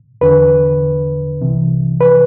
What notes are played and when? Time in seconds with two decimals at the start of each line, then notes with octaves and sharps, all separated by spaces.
0.21 E2 D3 B4
1.41 C2 C3 E3
2.01 B4